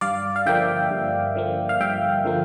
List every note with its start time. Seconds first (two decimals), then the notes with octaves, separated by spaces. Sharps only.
0.01 G2 D5 F5
0.36 F5
0.46 D3 F3 A#3 E5 G5
0.90 G2
1.35 D3 F3 A#3
1.69 F5
1.80 G2 E5 G5
2.25 D3 F3 A#3